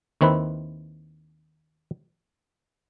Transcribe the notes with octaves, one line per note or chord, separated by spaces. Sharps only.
D#2 D#3 C4 E4 B4